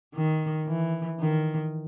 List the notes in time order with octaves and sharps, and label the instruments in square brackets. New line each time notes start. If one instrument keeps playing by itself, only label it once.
[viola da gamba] D#3
E3
D#3